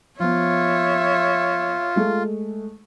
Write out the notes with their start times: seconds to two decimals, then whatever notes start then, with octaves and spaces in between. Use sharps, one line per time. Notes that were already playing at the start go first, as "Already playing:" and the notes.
0.20 F3 B3 F4 C#5 E5
1.96 G#3 A3